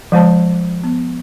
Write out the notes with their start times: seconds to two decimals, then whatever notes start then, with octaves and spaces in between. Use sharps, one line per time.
0.12 F3 G#3 C5 A5
0.84 B3